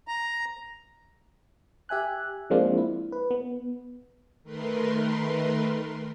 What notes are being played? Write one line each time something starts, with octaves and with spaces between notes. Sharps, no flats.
A#5
G4 E5 G#5 F#6
F3 G#3 A#3 C4 D4 F4
E4
B4
B3
D#3 A3 A#4 B4 C6